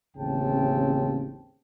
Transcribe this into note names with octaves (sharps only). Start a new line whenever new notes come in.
A1 D#2 C#3 C4 G5 A5